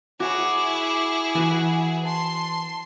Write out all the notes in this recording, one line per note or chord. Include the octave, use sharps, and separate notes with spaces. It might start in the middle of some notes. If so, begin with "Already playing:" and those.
E4 F#4 G#4 C#5 D6
E3 F#4 B4 G#5
A5 C6